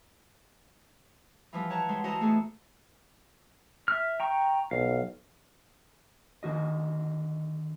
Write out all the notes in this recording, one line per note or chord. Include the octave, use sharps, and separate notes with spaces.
E3 F3 G3
C#5 F#5 A5 A#5
D3 G3 G#3 C5
E3 F#4 C5 D#5 A5 A#5
A3 B3 E4 G#4 A4
E5 F6
G5 A#5 C#6
B1 F5
D3 D#3 F#4 D#5